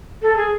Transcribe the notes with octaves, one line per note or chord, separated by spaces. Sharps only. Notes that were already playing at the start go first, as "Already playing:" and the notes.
A4
G#4